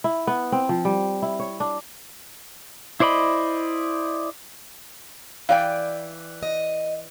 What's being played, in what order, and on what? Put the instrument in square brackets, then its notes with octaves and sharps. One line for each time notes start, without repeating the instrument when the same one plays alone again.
[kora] E4
B3
C4
F3
G3
E4
C#5
D4
[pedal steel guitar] E4 C5 D5 D#5 B5
[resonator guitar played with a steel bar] E3 D5 G5 [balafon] F5
[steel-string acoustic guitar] D#5